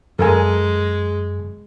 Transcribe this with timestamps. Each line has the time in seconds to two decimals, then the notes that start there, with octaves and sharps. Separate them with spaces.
0.19 F#2 G#3 A4 A#4 G#5